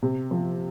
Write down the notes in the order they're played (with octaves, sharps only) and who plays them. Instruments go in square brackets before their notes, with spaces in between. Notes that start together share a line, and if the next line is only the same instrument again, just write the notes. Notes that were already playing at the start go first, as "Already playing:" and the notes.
[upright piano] C3
F3